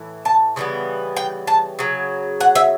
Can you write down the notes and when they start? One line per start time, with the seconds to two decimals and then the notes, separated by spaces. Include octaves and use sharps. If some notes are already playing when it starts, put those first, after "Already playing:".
Already playing: A2 E3
0.25 A5
0.56 C#3 E3 G3 B3
1.17 G5
1.47 A5
1.79 C#3 F#3
2.40 F#5
2.55 E5